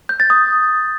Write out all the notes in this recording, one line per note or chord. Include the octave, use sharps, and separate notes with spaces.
G6
A6
D#6